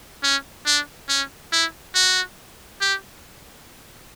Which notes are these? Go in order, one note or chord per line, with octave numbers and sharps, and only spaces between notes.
C#4
D4
C#4
E4
F#4
G4